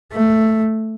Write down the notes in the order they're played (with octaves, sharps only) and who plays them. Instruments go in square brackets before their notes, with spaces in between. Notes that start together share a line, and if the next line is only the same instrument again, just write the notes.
[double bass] A3